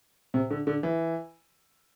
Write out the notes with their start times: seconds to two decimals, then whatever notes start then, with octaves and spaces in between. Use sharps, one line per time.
0.34 C3
0.51 D3
0.67 D3
0.83 E3